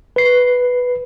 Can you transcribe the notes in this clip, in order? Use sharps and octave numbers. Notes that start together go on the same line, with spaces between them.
B4 C7